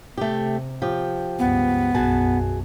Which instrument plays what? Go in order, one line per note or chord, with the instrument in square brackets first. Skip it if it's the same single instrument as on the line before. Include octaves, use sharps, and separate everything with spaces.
[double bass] C3 [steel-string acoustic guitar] A3 G4
[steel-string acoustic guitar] F3 G4
[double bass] C#2 G2 [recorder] B3
[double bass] B1 F#2 [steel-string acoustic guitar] F#4 G#4 A5